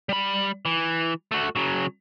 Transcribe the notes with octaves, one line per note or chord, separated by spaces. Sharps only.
G3 B5
E3
A3 F#4
C#3 F#3